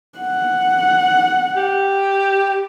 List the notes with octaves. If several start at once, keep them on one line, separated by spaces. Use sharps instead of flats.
F#5
G4